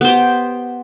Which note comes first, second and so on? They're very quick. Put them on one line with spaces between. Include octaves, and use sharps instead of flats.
B3 C5 G4